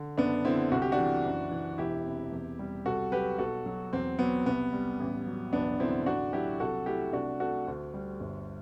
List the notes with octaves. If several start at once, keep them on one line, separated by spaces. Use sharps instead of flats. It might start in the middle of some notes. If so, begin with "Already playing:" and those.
Already playing: D3
F#1 B3 D4
D3 C4 E4
C2 F#4
G4
D4 F#4
E3
F#1
E3
E1 E4 G4
C3
E2
G3
C2 F#4 A4
F#3 G4 B4
B1 F#4 A4
F#3
E2 C4
F#3 B3
C2 B3
G3
A1
F#3
E1 B3 D4
D3 C4 E4
A1 D4 F#4
F#3 E4 G4
C2 F#4 A4
A3 E4 G4
C2 D4 F#4
A3 F#4 A4
D2
G3
G1